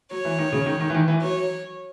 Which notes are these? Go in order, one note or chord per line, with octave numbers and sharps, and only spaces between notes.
F#3 C#5
E3
D#3
C#3
D#3
D#3
E3
D#3
E3
F#3 C#5